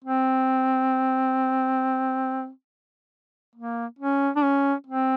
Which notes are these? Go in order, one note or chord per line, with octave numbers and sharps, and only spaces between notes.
C4
A#3
C#4
D4
C#4
C4